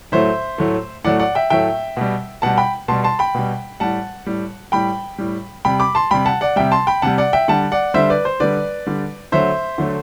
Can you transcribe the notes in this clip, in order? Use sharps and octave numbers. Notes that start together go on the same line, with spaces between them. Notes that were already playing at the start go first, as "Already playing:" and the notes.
A2 F#3 A3 C5 E5
A2 F#3 A3
A2 F#3 A3 D5 F#5
D5 F#5
E5 G5
A2 F#3 A3 E5 G5
B2 G3
B2 G3 F#5 A5
G5 B5
B2 G3 A5 C6
A5 C6
G5 B5
B2 G3
A2 G3 F#5 A5
A2 G3
A2 G3 G5 B5
A2 G3
C3 G3 G5 B5
B5 D6
A5 C6
C3 G3 G5 B5
F#5 A5
D5 F#5
C3 G3 E5 G5
A5 C6
G5 B5
C3 G3 F#5 A5
D5 F#5
E5 G5
D3 G3 F#5 A5
D5 F#5
D3 G3 C5 E5
B4 D5
C5
D3 G3 B4 D5
D3 G3
D3 F#3 A3 C5 E5
D3 F#3 A3